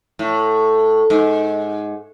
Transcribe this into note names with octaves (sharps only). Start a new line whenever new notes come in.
A2
G#2